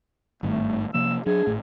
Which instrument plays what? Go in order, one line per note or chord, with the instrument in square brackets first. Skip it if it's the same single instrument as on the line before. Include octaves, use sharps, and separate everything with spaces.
[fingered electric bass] G#1 G2 D#3 [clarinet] A3
[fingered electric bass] C3 F3 A#3 [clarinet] E6
[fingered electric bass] F#3 D4 [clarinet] G#4
[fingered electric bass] G#1 A2